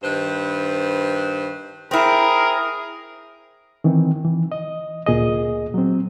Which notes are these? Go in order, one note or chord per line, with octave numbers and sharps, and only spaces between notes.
G2 D#3 B4 C5
C4 E4 G#4 A#4
D#3 E3 C4
E3
D#5
D2 A#2 G#4 D#5
F#3 C4